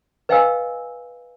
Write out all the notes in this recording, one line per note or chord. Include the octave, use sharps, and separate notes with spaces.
B4 D#5 F5 G5 G#5 E6